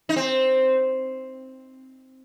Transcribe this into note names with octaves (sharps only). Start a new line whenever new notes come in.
D#4
C4